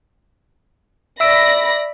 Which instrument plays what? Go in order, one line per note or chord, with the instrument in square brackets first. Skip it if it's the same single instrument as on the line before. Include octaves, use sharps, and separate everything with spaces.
[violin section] D5 B5 A#6 [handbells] E5 E6 D7